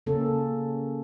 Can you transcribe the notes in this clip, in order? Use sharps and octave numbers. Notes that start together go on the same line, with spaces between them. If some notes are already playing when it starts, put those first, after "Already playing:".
C#3 A#3 C#4 A4